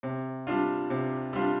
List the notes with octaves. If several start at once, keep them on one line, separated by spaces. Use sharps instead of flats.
C3
G3 D4 F4
C3
G3 D4 F4